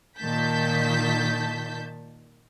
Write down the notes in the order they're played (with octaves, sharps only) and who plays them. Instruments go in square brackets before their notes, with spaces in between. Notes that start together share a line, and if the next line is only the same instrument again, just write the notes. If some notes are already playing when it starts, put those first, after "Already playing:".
[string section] A#2 D#3 A5 G6 B6